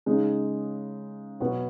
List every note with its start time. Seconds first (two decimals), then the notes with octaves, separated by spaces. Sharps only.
0.06 C#3 G#3 D#4
1.40 B2 F#3 B3 F#4